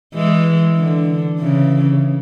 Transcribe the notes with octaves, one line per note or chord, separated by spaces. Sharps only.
E3 G#3
D3
C#3 E3